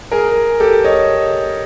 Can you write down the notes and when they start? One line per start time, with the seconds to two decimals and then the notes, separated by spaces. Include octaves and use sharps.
0.11 G#4 A#4
0.60 G4 A4
0.84 C#5 D#5